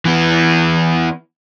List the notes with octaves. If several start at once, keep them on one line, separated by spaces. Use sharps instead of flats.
E3 B3